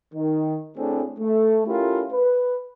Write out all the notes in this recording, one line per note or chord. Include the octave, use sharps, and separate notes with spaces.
D#3
A2 A3 C4 D4 G#4
A3
A3 C#4 E4 F4 G4 A#4
B4